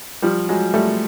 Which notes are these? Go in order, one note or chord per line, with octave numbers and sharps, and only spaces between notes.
F3 G3
F#3 G#3
G3 A3